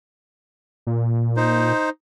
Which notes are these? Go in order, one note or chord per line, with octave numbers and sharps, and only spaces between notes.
A#2
D#4 C5